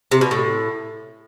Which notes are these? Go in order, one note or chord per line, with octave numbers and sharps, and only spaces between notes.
C3
B2
A2